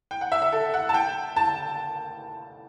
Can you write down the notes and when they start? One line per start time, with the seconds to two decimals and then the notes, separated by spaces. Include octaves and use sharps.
0.11 G5
0.21 F#5
0.32 E5
0.42 E5
0.52 A4
0.74 F#5
0.89 A5
0.94 G5
1.36 A5